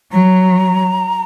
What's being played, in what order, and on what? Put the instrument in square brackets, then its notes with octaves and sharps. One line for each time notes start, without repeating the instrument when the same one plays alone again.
[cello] F#3 [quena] A#5